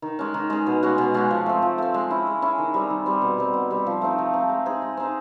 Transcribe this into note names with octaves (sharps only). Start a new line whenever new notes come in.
D#3
G#3 C#4
D#3
G#3 C#4
B2
G#3 C#4 F#4
B2
G#3 C#4 F#4
F3
A3 C4
F3
A3 C4
G#3
C#4 E4
G#3
C#4 E4
D#3
G3 C4
D#3
G3 C4
B2
G3 C4
B2
G3 C4
F3
A3 C4 D#4
F3
A3 C4 D#4
G#3
C4 D#4 G#4
G#3
C4 D#4 G#4